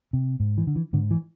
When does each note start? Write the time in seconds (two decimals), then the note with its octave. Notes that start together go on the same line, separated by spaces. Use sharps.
0.13 C3
0.40 G#2
0.58 E3
0.67 D3
0.76 E3
0.93 G#2 D3
1.11 E3